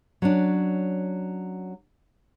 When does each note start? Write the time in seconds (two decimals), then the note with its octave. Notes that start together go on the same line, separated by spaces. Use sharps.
0.22 F#3 C#4 D4